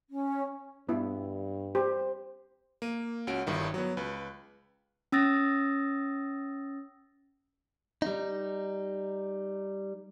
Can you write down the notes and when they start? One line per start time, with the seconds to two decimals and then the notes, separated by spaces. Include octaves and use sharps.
0.10 C#4
0.89 G2 B3 E4 E5
1.75 G4 C5
2.82 A#3 D#7
3.27 C#2 C#4 F#4 D7
3.47 G1 G2 D#3 E4
3.74 F#3 B3
3.97 C#2 B4
5.12 C#4 D#6 E6 A6 A#6
8.02 G3 D#4